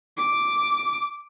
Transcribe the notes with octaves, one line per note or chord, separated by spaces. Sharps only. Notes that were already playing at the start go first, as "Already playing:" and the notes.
D6